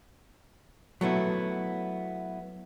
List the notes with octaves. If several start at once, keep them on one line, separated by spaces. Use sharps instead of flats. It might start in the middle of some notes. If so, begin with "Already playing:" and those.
F#3 A3 B3 E4